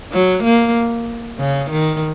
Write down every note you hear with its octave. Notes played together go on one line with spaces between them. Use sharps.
F#3
A#3
C#3
D#3